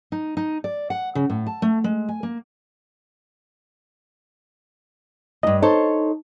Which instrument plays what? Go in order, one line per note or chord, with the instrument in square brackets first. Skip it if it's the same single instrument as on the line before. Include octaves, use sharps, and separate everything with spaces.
[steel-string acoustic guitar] D#4
D#4
D5
F#5
C#3
A2
A5
A3
G#3
G#5
A#3
[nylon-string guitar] E2 G2 [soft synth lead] D#5
[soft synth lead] D#4 [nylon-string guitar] A4 C5 C#5